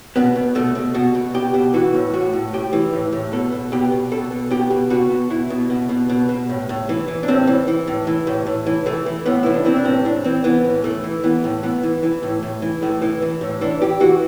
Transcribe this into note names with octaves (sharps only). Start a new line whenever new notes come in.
B2 B3
B2
B2 A3
B2
B2 F#4
B2
B2 G4
B2
E3 F#4
A2
A2 F#4
A2
A2 G4
E3
A2
A2
B2 A4
B2
B2 G4
B2
B2 A4
B2
B2 G4
B2
B2 F#4
B2
B2 E4
B2
B2
B2
B2
B2
A2
A2
E3
E3
D4
A2 C4
E3
E3
A2
E3
A2
A2
E3
E3 A3
E3
A2 B3
E3 E4
D4
E3 C4
D4
A2 C4
E3 D4
E3 C4
E3 B3
A2
E3 A3
E3
E3 B3
A2
E3 B3
E3
E3
A2
A2
E3
A2 A3
E3
E3
A2
E3 D4
E3 G4
E3 F#4